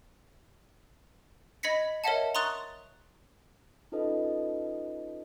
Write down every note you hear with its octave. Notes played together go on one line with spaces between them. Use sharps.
D#5 B5 G#6 A#6 B6 C#7
A#4 C#5 D#5 E5 F#5 A5
A#5 C6 C#6 D#6 F#6 A6
C#4 D#4 F4 A4 B4 D#5